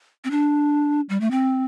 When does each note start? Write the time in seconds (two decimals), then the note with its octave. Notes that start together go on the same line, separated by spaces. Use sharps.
0.24 C4
0.31 D4
1.09 G3
1.21 A3
1.31 C4